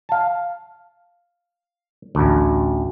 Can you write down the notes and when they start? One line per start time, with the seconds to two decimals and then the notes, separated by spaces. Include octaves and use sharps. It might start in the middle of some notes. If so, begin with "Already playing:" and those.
0.09 F5 A5
2.15 A1 D2